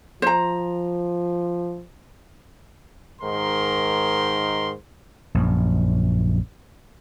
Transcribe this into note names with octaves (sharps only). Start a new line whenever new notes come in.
F3 C5 A#5
G#2 D#3 A#4 C6
A#1 F#2